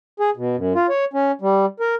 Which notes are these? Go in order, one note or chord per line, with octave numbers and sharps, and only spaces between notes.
G#4
B2
F#2
F4
C#5
C#4
G3
A#4